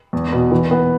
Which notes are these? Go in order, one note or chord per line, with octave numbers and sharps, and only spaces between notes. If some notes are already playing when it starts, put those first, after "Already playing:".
E2
B2
E3
B3